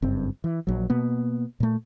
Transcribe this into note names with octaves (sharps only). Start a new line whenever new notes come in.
F#1 G2 C4
E3
A#1 F#3
B2 A#3 B3
A#2 A3